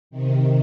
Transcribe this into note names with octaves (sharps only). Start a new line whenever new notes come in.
C3 D#3